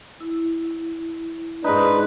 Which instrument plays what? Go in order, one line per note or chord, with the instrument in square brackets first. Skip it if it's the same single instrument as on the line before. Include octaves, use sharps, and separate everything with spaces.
[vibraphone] E4
[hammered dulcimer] G#2 D#4 [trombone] D4 [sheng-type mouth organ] B4